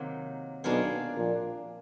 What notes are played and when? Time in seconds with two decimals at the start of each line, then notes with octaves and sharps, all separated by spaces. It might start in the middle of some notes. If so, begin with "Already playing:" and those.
Already playing: C3 D#3 F#3 A#3 D#4
0.64 B1 B2 A#3 D4 F4 G#4 C#5
1.15 A#1 A#2